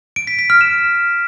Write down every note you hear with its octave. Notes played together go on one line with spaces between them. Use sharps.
D7
B6
B6
F6
E7